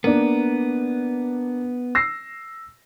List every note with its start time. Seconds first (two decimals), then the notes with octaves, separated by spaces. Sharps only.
0.04 A#3 B3 D4
1.95 E6 A#6 C7